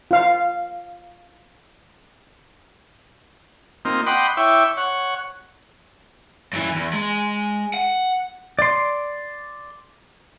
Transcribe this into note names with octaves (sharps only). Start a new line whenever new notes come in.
F4 F5
A#3 C4 D#4 F4
D#5 F#5 G5 B5 C6 D6
E4 C#5 E5 G5 D6
C#5 F#5
F#2 E3
E2
G#3
F#5
D5 C6